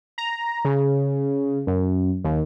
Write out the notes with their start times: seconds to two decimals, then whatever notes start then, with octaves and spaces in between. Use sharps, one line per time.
0.18 A#5
0.65 C#3
1.67 F#2
2.24 D#2